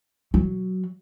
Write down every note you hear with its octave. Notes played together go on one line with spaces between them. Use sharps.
F#3